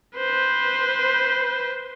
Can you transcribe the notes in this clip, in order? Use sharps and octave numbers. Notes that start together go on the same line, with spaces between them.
B4 C5